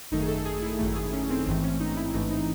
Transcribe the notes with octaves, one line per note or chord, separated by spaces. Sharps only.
G#1 F#2 D#3 A3 D#4
G#4
A4
G#4
E4
G#1 F#2 D#3 A3
G#4
C#4
C4
A1 G#2 E3 A3 C4
C#4
D#4
E4
A1 G#2 E3 A3 D#4
D#4